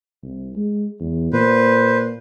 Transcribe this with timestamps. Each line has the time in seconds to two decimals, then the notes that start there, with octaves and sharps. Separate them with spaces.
0.23 C2
0.56 G#3
1.00 E2
1.33 A#2 B4 C5